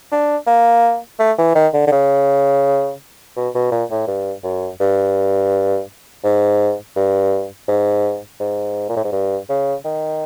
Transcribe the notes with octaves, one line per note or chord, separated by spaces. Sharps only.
D4
A#3
A3
E3
D#3
D3
D3
C#3
B2
B2
A#2
A2
G2
F#2
G2
G#2
G2
G#2
G#2
A#2
A2
G#2
G2
C#3
D#3